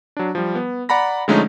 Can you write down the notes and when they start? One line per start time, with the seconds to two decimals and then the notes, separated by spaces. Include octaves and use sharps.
0.17 F#3 D4
0.35 F3 G3
0.55 B3
0.89 D5 F#5 A#5 B5 A#6
1.28 D3 F3 G#3 A3 C#4 D#4